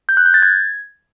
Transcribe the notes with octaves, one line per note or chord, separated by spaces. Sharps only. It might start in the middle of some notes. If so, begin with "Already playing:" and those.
G6
F#6
G6
A6
G#6